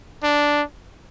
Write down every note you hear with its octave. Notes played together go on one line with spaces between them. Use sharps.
D4